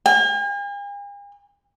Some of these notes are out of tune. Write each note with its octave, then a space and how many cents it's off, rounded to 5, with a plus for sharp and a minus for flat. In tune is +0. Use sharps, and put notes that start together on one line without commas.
G#5 -45